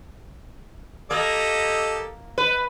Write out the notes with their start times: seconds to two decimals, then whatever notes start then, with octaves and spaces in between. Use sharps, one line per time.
1.11 A#3 G4 A4 D#5
2.38 B4